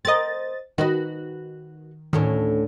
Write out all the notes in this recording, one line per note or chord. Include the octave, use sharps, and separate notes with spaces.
C4 A#4 D#5 A6
D#3 F#4 B4 D#5
D2 A2 D#3 C#4